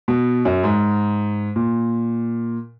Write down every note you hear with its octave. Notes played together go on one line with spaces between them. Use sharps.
B2
F#2
G#2
A#2